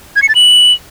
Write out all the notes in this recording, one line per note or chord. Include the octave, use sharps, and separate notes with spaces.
G#6
C#7
A6
F#7